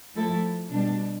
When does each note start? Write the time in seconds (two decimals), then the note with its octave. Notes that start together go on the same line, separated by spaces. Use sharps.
0.14 F3 A3 E4 A4
0.71 B2 G3 D4